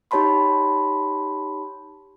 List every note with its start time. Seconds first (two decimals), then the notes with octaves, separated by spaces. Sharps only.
0.11 D#4 G4 C#5 A5 B5 C6